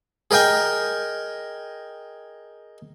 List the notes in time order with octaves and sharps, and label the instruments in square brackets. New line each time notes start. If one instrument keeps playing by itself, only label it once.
[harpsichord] G#4 A#4 D#5 G5 G#5